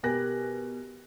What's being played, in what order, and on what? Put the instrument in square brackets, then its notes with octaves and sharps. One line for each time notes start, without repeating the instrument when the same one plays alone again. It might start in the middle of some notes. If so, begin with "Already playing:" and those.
[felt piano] B2 G4 A#4 G#5 F#6 A#6